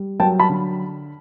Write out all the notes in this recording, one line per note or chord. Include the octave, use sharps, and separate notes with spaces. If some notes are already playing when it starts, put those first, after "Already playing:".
Already playing: G3
F#3 G5 A5
A5 B5
D3